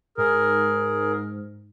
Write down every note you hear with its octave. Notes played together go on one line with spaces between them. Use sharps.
G#2 G#4 A#4